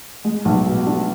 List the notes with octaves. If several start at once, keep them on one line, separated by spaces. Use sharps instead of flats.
G#3
B1
B2
D4